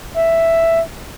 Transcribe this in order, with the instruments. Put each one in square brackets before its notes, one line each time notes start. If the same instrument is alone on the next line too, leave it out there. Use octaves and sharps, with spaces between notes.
[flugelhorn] E5